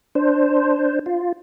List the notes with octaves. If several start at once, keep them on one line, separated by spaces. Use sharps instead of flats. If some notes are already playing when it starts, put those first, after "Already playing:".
D4 C5
F4